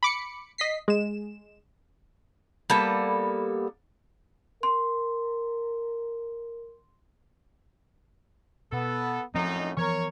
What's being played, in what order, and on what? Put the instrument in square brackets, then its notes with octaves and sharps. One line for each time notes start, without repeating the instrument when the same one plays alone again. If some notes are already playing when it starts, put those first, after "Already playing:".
[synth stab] B5 D6 C#7
D#5 B6 C7
G#3 E7
[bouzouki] G3 A#3 B3 A4
[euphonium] A#4 [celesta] C6
[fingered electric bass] B2 [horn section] B3 A4
[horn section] F#2 A2 D#4 [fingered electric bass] F3 C4
[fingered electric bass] E3 F3 B3 [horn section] A#4 C#5